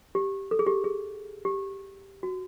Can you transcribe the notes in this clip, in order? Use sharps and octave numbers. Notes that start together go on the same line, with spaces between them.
G4
A4
G#4
G4
G#4
G4
F#4